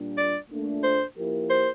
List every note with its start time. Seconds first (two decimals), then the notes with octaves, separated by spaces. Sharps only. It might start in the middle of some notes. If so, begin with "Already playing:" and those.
Already playing: A#2 G3 D4
0.17 D5
0.50 A#2 A3 D4
0.84 C5
1.17 F3 A#3 E4 G4 A#4
1.50 C5